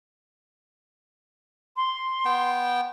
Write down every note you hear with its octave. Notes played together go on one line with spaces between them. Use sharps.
C6
B3 G5